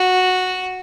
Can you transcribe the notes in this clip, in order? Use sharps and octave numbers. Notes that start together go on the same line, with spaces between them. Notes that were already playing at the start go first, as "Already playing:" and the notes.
Already playing: F#4